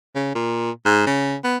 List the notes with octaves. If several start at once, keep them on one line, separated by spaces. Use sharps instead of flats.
C#3
A#2
G#2
C#3
B3